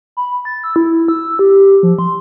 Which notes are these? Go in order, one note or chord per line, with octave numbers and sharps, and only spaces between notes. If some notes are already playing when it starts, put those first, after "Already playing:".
B5
A6
E6
E4
E6
G4
F3
C6